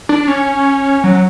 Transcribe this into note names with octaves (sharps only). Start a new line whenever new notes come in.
D4
C#4
F#3